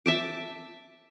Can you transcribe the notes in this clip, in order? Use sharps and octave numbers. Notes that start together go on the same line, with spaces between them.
E5 A5 D6